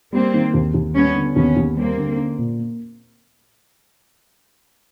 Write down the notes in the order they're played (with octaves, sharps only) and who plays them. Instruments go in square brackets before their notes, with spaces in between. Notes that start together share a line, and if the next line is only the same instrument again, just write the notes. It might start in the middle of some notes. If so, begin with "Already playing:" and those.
[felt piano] G3 [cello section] A#3 C4
[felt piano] D#3
D#2
D#2
[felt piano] G3 [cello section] B3 C#4
[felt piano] D3
[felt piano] D#2 [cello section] B3 C#4
[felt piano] D#2
[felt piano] G3 [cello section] A#3 C4
[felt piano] D3
C#4
A#2
A#3